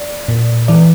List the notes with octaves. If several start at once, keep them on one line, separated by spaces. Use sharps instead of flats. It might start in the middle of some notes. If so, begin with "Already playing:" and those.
Already playing: D5
A#2
E3 D5